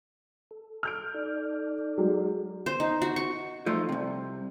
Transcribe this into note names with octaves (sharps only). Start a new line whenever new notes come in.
A4
F6 G6 D7
D#4 A4 D5
F#3 G#3
C5
D#4
F#4
C#6
F3 A3 D#4 F4
C2 C3